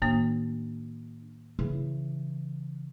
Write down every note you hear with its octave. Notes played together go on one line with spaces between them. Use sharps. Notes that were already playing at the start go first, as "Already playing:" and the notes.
A2 D#3 A#3 D4
C#3 E3